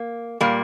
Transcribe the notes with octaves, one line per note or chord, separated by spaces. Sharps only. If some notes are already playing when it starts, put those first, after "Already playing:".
Already playing: A#3
A#2 G3 A#3